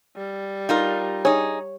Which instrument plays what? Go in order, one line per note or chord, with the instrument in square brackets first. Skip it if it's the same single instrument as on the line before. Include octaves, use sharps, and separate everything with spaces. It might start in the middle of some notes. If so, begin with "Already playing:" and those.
[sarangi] G3
[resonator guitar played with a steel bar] D#4 F4 A#4
[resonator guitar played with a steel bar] D#4 G#4 [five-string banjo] C#5